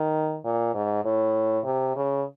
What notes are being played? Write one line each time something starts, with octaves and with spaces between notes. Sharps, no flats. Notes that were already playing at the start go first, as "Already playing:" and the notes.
Already playing: D#3
A#2
G#2
A2
C3
C#3